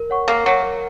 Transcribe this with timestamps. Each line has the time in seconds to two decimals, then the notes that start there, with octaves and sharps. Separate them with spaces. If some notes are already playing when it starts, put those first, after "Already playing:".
Already playing: A#4
0.10 C#5 F#5 C#6
0.28 A#3 A#4
0.45 F#3 C#5 F#5 C#6
0.63 A#4